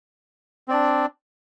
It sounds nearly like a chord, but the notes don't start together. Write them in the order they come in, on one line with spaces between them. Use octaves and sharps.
C4 D5 D4